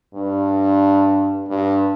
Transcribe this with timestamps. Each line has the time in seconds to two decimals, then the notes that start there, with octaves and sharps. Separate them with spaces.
0.14 G2
1.48 G2